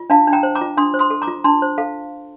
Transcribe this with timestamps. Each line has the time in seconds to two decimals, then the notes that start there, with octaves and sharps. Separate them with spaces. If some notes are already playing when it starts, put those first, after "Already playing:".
Already playing: F4
0.10 D4 F5 A5
0.27 D4
0.33 G5 A#5
0.43 C5
0.55 A#5 D6
0.61 F4
0.77 D4 C6 D#6
0.94 C5
0.99 C6 D#6
1.10 A4
1.22 A#5 D6
1.28 F4
1.44 D4 A5 C6
1.62 C5
1.78 A4 F5